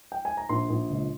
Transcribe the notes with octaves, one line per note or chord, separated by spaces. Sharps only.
G5
G#5
A#5
A#1 C6
A#1
C#2